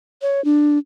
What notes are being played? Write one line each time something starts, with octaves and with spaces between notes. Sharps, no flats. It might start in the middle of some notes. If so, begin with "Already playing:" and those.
C#5
D4